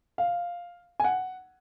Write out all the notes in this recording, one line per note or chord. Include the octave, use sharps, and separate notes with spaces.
F5
G#5
F#5